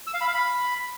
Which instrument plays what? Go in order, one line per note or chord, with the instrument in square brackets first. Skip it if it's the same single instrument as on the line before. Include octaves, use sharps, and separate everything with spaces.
[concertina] E6
F5
B5
F5
B5